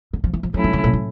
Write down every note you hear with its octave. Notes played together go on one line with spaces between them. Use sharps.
D3
F3
E3
F3
F3 F#3 A3 C#4 E4
D#3
D3
A#2
A2